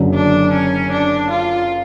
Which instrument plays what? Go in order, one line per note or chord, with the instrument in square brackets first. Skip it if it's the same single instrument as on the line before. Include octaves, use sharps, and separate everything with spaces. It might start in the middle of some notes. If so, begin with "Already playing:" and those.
Already playing: [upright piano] F#1 F#2 D3
[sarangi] D4
C#4
D4
F4